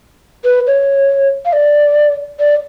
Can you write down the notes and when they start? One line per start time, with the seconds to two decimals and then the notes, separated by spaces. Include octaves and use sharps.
0.44 B4
0.67 C#5
1.45 F5
1.53 D5
2.40 D5